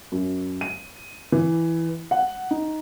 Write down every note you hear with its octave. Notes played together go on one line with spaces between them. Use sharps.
F#2
D#7
E3
F#5
D#4